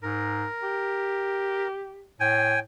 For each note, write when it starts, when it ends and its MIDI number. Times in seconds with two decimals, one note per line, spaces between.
0.02 0.46 44
0.02 1.68 70
0.63 2.12 67
2.20 2.59 45
2.20 2.59 79
2.20 2.59 80